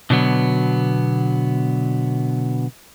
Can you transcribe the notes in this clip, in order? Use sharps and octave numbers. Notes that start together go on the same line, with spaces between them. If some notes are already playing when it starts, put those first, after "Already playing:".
B2 D3 F#3 B3